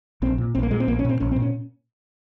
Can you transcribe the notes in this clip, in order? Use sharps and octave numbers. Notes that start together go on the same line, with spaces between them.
A#1 C4
A#2
A#1 C4
A#3
A#2 G#3
C4
A#1 A#3
C#4
A#2 C4
A#1 C#4
C4
A#2
C#4